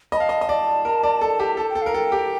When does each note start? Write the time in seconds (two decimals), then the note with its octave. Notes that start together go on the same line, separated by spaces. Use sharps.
0.12 D#5 B5
0.17 F5 A5
0.29 D#5
0.41 D#5
0.49 D5
0.85 A#4
1.03 D5
1.21 A4
1.40 G4
1.57 A4 A5
1.70 G5
1.75 A4
1.82 A#4 F5
1.94 A4 G5
2.12 G4